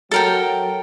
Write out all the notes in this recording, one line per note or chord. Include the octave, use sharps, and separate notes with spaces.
F#3 A4 A#4 G5